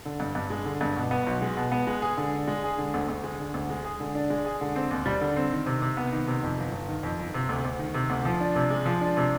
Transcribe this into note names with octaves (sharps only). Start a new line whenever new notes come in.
D3
G2
G2
G#3
D3
G2
B2
B3
B1
G#3
B2
B3
G#3
G#4
D3
D4
G#3
G#4
D3
D2
D2
G#3
D3
D2
G#3
G#4
D3
D4
G#3
G#4
D3
C4
D#2
G3
D3
C4
D#3
C3
C3
B3
D#3
C3
F2
G1
G1
D#3
F2
G1
C3
D2
D2
D#3
C3
D2
F3
D4
C3
G#3
F3
D4
C3